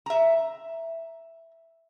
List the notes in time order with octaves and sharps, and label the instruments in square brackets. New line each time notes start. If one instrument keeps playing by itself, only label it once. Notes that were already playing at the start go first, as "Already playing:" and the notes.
[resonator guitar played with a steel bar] E5 A#5